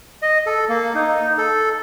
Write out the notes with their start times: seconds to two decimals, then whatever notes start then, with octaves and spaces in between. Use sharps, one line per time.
0.22 D#5
0.46 A4
0.69 A#3
0.95 D#4
1.38 A4